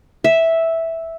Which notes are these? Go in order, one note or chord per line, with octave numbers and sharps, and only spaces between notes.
E5